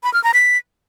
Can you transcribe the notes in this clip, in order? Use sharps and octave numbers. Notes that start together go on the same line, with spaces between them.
B5
F6
A#5
B6